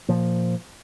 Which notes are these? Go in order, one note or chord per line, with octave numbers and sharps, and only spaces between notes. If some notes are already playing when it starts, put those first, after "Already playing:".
A#2 F3